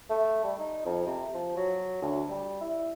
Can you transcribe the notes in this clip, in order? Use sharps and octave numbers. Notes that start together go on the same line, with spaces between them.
A3
G3
D#4
F2
C3
F3
F#3
D2
G3
E4